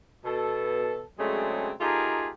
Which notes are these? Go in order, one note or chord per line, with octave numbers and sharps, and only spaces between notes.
B2 A4
C#3 F#3 G#3 A3 C4 D4
A3 D#4 F4 G4 G#4 A#4